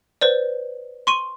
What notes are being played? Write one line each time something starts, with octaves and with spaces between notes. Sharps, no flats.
B4 C5 D5
C6 C#6 D#7